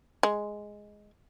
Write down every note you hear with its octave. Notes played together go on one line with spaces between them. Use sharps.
G#3